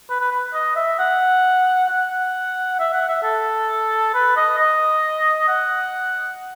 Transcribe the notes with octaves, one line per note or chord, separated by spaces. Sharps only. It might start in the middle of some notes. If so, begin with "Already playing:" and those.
B4
B4
B4
D#5
E5
F#5
F#5
E5
F#5
E5
A4
B4
D#5
D#5
F#5